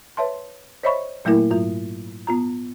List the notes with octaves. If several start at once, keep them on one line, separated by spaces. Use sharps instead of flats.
B4 C#5 E5 A5 C6
C5 C#5 D#5 E5 B5 C#6
A#2 F#3 A3 A#3 E4 A#4
G#2 F#3 F4
B3 F4 A#5